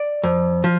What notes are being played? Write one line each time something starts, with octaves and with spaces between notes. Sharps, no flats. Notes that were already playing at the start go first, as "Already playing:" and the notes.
Already playing: D5
F2
F3